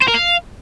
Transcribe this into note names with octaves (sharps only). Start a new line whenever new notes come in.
C5
A#4
F5